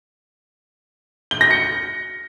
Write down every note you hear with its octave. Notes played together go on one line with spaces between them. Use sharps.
G7
A#6
C#7